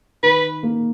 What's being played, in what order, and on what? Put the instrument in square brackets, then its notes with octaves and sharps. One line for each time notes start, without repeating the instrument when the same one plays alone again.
[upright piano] D#3 [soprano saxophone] B4
[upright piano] A#3